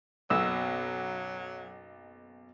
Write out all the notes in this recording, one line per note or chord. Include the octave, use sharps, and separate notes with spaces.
F#1 B1 B2 F#3 F#4 E6